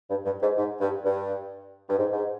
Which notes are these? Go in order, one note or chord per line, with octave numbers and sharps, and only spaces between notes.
G2
G2
G#2
G#2
G2
G2
G2
G#2
G#2